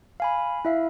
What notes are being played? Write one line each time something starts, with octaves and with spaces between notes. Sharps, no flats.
F5 G#5 B5
E4 E5 F5